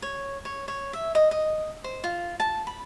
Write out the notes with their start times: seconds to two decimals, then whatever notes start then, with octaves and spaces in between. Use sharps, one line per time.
0.02 C#5
0.45 C#5
0.68 C#5
0.93 E5
1.15 D#5
1.31 D#5
1.84 C5
2.04 F4
2.40 A5
2.67 B5